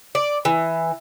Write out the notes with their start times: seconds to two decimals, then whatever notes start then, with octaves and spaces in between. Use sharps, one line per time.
0.15 D5
0.45 E3